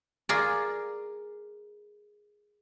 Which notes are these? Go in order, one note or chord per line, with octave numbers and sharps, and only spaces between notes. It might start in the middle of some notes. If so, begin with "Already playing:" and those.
F4 G#4 A#4 D5